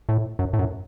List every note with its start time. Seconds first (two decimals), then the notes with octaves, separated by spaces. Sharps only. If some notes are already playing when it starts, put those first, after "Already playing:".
0.09 A2
0.39 F#2
0.53 A2
0.59 F#2